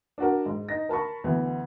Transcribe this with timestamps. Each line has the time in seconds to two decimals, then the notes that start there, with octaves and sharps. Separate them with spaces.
0.18 D4 F#4 A#4
0.46 G#2
0.69 D#4 A#6
0.89 A#4 A5 B5 C#6
1.24 D2 E3 B3